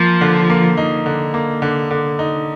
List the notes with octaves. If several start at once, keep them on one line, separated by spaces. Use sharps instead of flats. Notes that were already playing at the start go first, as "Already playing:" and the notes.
Already playing: F3 A#3
D3
A#3
D#4
D3
A#3
D3
D3
D#4